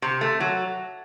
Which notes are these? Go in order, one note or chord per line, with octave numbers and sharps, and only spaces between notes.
C3
A3
F#3